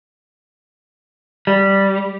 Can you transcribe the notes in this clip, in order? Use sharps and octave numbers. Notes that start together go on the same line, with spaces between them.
G3